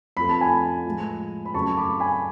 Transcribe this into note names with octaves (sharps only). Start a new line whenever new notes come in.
F2 F3 A3 B5
A5
G#5 B5
A2 F3 G#3
B5
F#2 C#3 F#3 A3 A5 C#6
B5 D6
G#5 B5